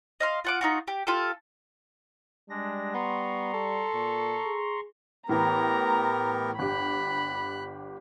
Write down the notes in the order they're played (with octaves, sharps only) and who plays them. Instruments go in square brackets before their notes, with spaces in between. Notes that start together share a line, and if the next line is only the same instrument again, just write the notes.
[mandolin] D#5 F5 C6
F4 F#5 D6
D#4 F4 F#4
G4
F4 G4 A4
[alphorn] G3 [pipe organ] G#3 D4 A#6
[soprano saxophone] B3 [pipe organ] A#5 C6 C#6
[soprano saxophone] A4
[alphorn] A#2
G#4
[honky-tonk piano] A2 E3 [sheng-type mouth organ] B3 G4 A#4 [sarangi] A#5
[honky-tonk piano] G1 G4 [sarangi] B5 [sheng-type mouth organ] F#6